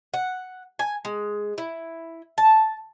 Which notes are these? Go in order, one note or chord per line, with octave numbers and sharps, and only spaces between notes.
F#5
G#5
G#3
E4
A5